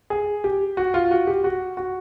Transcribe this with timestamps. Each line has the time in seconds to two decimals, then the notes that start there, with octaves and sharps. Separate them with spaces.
0.10 G#4
0.44 G4
0.77 F#4
0.94 F4
1.11 F#4
1.27 G4
1.44 F#4
1.77 F#4